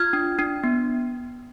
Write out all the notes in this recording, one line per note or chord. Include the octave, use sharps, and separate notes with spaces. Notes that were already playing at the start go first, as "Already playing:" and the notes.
Already playing: F4 F6 G#6
D4
D4
B3